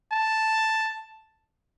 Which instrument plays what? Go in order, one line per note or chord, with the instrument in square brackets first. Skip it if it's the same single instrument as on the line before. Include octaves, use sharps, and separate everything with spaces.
[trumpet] A5